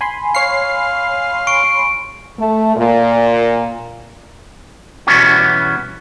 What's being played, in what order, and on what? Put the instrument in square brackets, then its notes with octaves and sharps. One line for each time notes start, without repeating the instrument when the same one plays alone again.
[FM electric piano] G#5 B5 C6
[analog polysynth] C#5 C7 [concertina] F5
[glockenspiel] C#6 D7
[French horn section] A3
A#2
[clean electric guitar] B2 E3 G3 B3 C#4 F#4